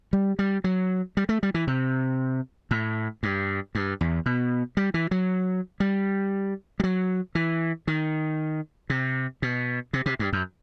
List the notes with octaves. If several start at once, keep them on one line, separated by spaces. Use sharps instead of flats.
G3
G3
F#3
G3
A3
G3
E3
C3
A2
G2
G2
E2
B2
G3
E3
F#3
G3
G3
F#3
E3
D#3
C3
B2
C3
C3
G2
F#2